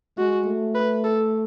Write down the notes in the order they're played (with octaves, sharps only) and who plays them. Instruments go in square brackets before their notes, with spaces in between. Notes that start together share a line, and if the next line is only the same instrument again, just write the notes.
[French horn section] G#3 [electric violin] F#4
[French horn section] A3
[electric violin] B4
A4